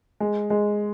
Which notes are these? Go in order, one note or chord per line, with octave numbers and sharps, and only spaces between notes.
G#3
G#3